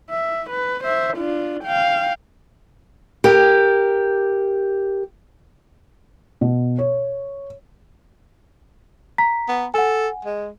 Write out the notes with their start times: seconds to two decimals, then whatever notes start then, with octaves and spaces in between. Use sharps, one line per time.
0.10 E5
0.50 B4
0.84 C5 E5
1.17 D4 F4
1.64 F5 G5
3.24 G4 A#4
6.41 B2
6.79 C#5
9.18 A#5 B6
9.48 B3
9.74 A4 F#5 G#5
10.25 G#3